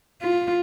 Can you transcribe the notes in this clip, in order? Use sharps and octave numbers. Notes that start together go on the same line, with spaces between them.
F4